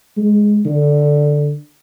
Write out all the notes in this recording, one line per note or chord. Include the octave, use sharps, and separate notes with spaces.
G#3
D3